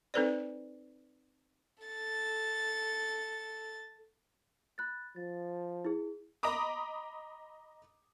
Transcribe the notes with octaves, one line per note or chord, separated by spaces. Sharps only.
C4 D#4 A4 B4 C5 D5
A4 A6
B5 F#6 A6
F3 A6
E4 G#4
D#5 A#5 B5 D6 D#6